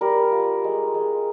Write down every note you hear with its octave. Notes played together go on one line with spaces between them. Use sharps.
G3 A#4
F4
G#3
G#3